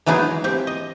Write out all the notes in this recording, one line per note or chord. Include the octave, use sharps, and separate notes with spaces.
E3 F#3 G#3 B3 D#4 G#4
C4 G4
D#5